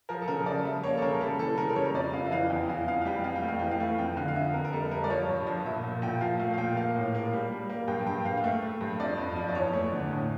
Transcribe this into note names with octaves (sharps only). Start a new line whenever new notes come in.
F3 A#4
A4
C#3 A#4
F3 D5
G3 E5
A#3 C#5
A4
C#3 A#4
G3 A4
E3 A4
C#3 A#4
A#4
G3 C#5
F2 D5
F2 F5
E5
E3 F5
E2 G5
E3 F5
F2 F5
F5
G3 G5
F2 F5
G5
A3
F5
E3 G5
F5
A3
F2 G5
D3 F5
F5
F2 E5
F2 A#4
A#4
G3 A4
G3 A#4
D5
F3 C#5
G2
F3
A#2 E5
A#2
A#2 G5
F3 F5
A3 F5
F5
A#2 G5
A#3 F5
A2
A#3
G3
G3
A#3
G2 G5
G2 G5
G2 F5
F5
A3 E5
A3
G2
F2 D5
F2
F3
D5
E2 C#5
A3
D3
A2